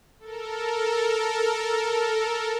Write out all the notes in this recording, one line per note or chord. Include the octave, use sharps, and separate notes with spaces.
A4 A#4